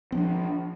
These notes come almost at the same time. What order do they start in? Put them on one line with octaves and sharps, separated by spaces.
C4 F3 D4